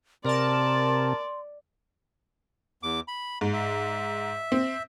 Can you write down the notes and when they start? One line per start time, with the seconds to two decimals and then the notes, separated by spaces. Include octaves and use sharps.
0.25 C3 A#4 D5 A5 C6
2.83 E2 D6
3.08 B5
3.41 G#2
3.53 E5
4.52 C4